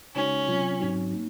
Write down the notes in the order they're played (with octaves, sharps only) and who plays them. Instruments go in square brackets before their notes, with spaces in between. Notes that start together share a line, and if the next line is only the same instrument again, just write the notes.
[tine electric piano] C#3 G#3 D#4 F#4 [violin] C#4
[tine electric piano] C3 F#3 C4 F4
G#2 F#3 C4 D#4 F#4
A#3 D#4